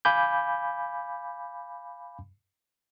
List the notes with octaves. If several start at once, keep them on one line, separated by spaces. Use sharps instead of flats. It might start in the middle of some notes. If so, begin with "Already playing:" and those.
F5 G#5 B5 D6 G6